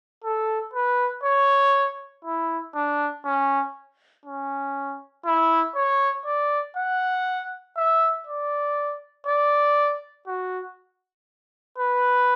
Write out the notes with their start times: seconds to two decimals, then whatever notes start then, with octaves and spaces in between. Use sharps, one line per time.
0.24 A4
0.74 B4
1.24 C#5
2.25 E4
2.75 D4
3.25 C#4
4.26 C#4
5.26 E4
5.75 C#5
6.26 D5
6.77 F#5
7.77 E5
8.27 D5
9.27 D5
10.27 F#4
11.78 B4